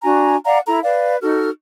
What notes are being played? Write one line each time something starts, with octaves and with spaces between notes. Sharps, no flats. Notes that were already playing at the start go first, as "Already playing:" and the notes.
D4 F#4 G#5 A#5
D5 F5 F#5 A#5
E4 A4 A#5
B4 D5 F5
D#4 F#4 A4 F6